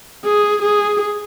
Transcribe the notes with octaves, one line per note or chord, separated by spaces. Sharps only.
G#4
G#4